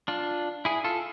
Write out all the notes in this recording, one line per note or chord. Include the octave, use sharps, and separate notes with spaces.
D4 F4
E4 G#4
F4 A4